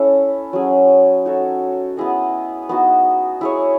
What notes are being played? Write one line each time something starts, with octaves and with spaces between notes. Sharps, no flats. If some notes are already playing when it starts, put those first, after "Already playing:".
Already playing: C#4 E4 A4
F#3 C#4 G#4
D#4 F#4 A4 C#5
B3 E4 G#4 D#5
B3 D#4 F#4
E4 G#4 C#5